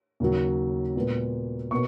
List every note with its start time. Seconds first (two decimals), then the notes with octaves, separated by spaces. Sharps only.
0.20 D#2 C#3 F#3
0.95 A#2 G#3 B3
1.71 B2 A#3 C#6